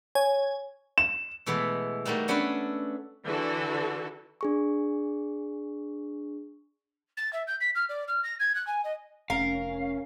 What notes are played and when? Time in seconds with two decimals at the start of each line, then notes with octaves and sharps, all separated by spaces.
0.15 C#5 G#5
0.98 E7
1.46 B2 E3 G#3 A3 B3 A4
2.05 G3 A3 A#3 D#4 F#4
2.28 B3 C#4 D4 F#4 A4 B4
3.25 D3 E3 F#4 A4
4.41 D4 G#4 C#6
7.17 A6
7.33 E5
7.47 G6
7.60 B6
7.75 F6
7.89 D5
8.08 F6
8.23 A#6
8.39 G#6
8.55 F#6
8.67 G#5
8.84 D#5
9.30 F1 C#4 A#4 F5